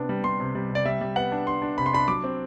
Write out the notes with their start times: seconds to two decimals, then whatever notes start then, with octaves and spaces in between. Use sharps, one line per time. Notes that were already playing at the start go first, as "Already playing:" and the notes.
Already playing: C3 B3 D4
0.09 G3
0.24 G3 C6
0.40 C3
0.55 G3
0.70 C3
0.75 D5
0.85 G3 E5
1.01 G3
1.16 B3 F#5
1.32 D4
1.47 D4 C6
1.62 D4
1.78 C3 B5
1.86 C6
1.93 D4 B5
2.08 F#3 D6
2.24 C4